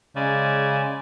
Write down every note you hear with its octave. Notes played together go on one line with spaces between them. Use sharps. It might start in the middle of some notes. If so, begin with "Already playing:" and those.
C#3 G#3 D5 G#5